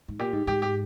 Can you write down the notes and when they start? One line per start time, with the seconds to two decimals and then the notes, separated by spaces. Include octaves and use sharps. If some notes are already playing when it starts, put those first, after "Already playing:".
0.08 G#2
0.19 A#2 G4
0.33 G#2
0.47 G#2 G4
0.62 G4